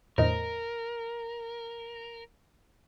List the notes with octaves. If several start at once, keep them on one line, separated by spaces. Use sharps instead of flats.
E2 A2 D3 A#4 C5 D#5